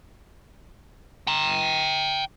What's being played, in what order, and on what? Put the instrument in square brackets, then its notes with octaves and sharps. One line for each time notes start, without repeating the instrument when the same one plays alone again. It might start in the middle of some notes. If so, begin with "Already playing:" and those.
[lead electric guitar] G5 A#5